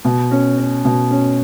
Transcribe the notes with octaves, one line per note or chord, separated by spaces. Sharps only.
B2
C#4
C#4
B2
C#4